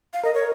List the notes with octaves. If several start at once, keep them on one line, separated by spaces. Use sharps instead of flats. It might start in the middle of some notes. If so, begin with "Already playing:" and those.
F5
A#4 D#5
C#5